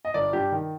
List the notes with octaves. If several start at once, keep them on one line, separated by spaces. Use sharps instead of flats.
D#5
G1 D5
G2 G4
D#3